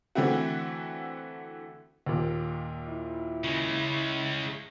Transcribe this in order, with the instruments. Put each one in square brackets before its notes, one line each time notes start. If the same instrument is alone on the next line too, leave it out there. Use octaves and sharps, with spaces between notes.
[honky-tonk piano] D3 E3 A3 C4 E4 F#4
[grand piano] D#2 A#2
[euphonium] E4
[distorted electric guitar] C#3 G#3